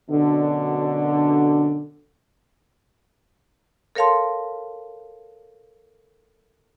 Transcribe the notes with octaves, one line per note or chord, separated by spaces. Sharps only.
F#2 B2 D3
A4 A#4 C#5 F5 A5 C6